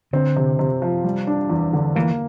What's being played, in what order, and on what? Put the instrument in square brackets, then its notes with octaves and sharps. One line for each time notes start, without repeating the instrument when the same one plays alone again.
[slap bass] D3 [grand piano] C4
[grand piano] C3
C3
F3
G3
D4
E2
D3
[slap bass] E3 [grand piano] A#3